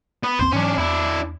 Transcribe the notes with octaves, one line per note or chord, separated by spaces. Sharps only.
B3
A1 D#2 C4 C5
G#2 E3 F#3 C#4 D4
E2 D4 E4